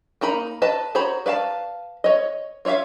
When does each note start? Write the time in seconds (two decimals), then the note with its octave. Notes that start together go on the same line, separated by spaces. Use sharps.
0.21 A#3 D#4 A#5 B5
0.62 B4 D#5 A5
0.95 F#4 C5 C#5 A#5 B5
1.26 B4 D5 F5 A5
2.04 C#5 D#5
2.65 F4 C#5 D5 E5 F5